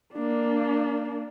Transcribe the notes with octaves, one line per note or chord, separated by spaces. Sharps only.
A#3 D4